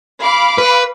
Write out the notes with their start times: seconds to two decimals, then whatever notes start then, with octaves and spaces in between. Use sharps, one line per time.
0.22 F5 B5 D6
0.58 B4